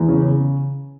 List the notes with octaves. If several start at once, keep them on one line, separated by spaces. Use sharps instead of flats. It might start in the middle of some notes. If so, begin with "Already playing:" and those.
Already playing: E2
C#3
C#3